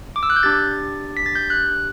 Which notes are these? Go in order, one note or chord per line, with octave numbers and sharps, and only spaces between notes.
D6
E6
F#6
G6
D4 G4 A6
B6
A6
G6
F#6